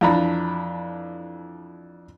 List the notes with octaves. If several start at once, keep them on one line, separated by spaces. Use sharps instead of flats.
F2 E3 D4 A#5 B5